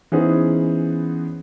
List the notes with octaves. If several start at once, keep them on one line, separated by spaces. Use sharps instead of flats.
E3 B3 C#4 D#4 G#4 C5